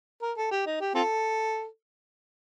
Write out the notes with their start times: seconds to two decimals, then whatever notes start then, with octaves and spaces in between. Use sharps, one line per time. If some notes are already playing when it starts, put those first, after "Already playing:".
0.22 A#4
0.37 A4
0.51 G4
0.66 D#4
0.81 G4
0.95 C4 F4 A4